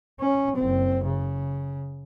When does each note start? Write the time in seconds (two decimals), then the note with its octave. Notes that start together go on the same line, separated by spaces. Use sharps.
0.20 C#4
0.56 F#1 C4
1.04 C#3